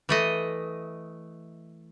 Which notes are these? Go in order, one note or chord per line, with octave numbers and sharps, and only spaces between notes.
E3 A3 D#5